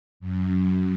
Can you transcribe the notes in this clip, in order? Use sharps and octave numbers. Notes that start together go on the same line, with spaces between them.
F#2